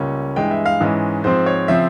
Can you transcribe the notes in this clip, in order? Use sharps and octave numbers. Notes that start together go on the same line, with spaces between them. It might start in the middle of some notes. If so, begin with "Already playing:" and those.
Already playing: C#2 C#3 G3 A#3 C#4
G2 E3 G#3 G5
E5
F5
G#2 E3 G#3 C#4
G#2 F3 C4 C5
C#5
C#3 F3 C4 E5